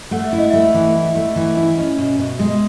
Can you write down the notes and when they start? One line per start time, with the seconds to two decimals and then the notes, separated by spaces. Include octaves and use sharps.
0.11 A3 F#5
0.24 E5
0.33 E4
0.38 D#5
0.50 A3 E5
0.74 E3
0.95 E4
1.15 A3
1.36 E3
1.57 E4
1.77 C#4 D#5
1.98 B2
2.19 B2
2.39 G#3